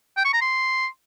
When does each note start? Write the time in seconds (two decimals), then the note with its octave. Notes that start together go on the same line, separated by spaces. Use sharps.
0.17 G5
0.25 C#6
0.33 A#5
0.41 C6